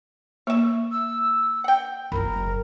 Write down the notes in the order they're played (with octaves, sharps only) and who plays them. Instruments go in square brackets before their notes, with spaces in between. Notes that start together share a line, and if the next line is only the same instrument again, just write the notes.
[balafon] A#3 [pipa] C#5 E5
[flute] E6
[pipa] F#5 G5
[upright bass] F#1 F#2 [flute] A#4 [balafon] B5